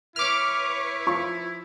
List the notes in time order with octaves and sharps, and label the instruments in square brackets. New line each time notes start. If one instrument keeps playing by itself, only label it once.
[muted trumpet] E4 [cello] B4 C#5 [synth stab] D6 F6
[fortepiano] F3 F4 C#6